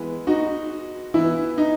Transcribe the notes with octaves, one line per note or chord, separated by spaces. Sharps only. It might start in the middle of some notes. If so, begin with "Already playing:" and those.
Already playing: E3 G#3 B3
D#4 F#4
E3 B3 E4
D#4